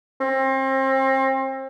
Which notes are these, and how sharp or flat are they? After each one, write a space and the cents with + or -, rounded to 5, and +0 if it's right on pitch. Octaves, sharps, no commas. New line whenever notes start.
C4 +35